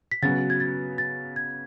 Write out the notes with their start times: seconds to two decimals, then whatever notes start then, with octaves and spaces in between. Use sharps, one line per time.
0.12 B6
0.22 C#3 F#3 B3 F#4 A6
0.50 G#6
0.60 A6
0.98 A6
1.36 G#6